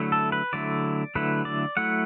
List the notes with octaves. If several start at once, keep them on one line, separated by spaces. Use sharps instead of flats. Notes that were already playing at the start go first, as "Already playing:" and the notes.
Already playing: D3 F#3 A3 E4
A4
B4
D3 F#3 A3 E4 D5
D3 F#3 A3 E4 B4
D5
F#3 A3 E4 F#5